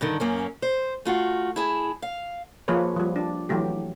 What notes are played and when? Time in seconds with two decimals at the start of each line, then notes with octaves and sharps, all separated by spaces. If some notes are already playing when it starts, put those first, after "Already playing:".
0.01 G2 D3 D#3
0.20 F#2 A#3 C#4
0.62 C5
1.05 A3 F4 F#4
1.56 E4 G#4 A5
2.02 F5
2.68 F3 A#3 G#4 B4 C#5
2.96 F3 G3
3.16 D4
3.49 E3 F#3 A3 G4